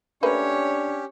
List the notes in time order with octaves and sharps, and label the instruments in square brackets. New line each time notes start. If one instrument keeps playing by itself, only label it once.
[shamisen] A3 A#3 B4 [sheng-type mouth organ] C#4 G4 [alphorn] D4 [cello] C#5